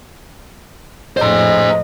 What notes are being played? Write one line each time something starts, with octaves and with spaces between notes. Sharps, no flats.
F2 A2 C5 D#5 A#5